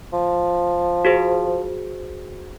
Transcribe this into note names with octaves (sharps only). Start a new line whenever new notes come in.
F3
F#4 G#4 C5